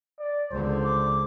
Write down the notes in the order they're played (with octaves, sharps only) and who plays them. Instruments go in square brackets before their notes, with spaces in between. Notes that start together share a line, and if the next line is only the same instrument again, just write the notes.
[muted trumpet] D5
[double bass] C#2 D3 [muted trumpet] C5
[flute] D6